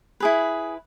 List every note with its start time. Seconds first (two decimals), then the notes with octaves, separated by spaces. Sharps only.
0.20 E4 G#4 B4